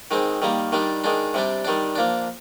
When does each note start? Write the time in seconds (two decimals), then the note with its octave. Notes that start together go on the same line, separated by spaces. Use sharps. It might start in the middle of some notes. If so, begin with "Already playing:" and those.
0.11 D#3 G#3 C4
0.42 D#3 G3 A#3
0.72 D#3 G3 D4
1.04 D#3 G#3 D4
1.34 C3 G3 D4
1.65 D#3 G3 D4
1.95 F3 A#3 D4